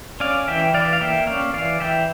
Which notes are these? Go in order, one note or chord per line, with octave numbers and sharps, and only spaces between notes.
C#4 D5 F5
E3 E5 G5
E3 D5 F5
F5
A#3 E5 G5
C#4 D5 F5
E3 D5 F5
E3 E5 G5